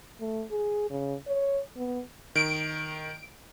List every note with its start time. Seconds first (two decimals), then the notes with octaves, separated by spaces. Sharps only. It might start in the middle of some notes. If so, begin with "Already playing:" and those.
0.20 A3
0.51 G#4
0.90 C#3
1.27 C#5
1.77 B3
2.35 D#3 D7